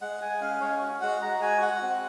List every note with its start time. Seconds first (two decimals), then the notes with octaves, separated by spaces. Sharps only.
0.01 G#3 F#5
0.21 G#3 G#5
0.41 C#4 F5
0.61 G#3 C#5
0.82 F#4
1.01 G#3 F#5
1.22 G#3 A#5
1.41 F#4 G#5
1.62 F#4 F#5
1.82 C4